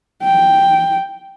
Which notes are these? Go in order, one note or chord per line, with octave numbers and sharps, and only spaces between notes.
G5